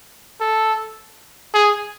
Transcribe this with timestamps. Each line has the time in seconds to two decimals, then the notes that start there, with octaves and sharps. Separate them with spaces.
0.41 A4
1.54 G#4